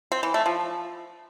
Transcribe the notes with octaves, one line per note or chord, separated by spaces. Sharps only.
C4
E3
A3
F3